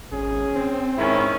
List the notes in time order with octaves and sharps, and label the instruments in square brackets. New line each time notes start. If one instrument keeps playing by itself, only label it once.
[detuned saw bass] G#1 [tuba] C#4 [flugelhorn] G#4
[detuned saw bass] C4
[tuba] G#2 [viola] D#3 C#4 [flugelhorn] E4